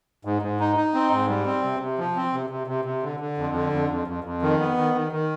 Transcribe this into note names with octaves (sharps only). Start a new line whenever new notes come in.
G#2
G#2
D#4
D#4
C4
G#2
G3
C4
C3
C3
F3
C4
C3
C3
C3
C3
D3
D3
F2
D3
F2
F2
F2
F2
D#3
B3
D#3
D#3
D#3